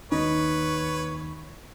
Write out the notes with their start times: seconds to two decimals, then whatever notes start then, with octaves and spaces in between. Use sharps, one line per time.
0.12 D#2 D#4 B4 C#5